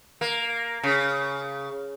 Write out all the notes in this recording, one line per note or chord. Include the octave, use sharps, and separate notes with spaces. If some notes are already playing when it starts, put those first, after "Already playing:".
A#3
C#3